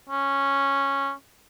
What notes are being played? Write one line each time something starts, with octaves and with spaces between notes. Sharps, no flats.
C#4